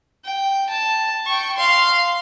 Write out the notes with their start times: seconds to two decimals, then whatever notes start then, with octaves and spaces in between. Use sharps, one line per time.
0.24 G5
0.69 A5
1.26 G5 C#6
1.57 F5 C6